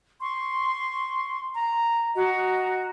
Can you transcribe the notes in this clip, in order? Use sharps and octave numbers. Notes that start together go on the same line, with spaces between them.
C6 C#6
A#5
F#4 D#5 A#5